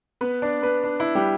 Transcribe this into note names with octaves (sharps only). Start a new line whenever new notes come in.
B3 B4
D4 D5
B3 B4
D4
E4
G3 G4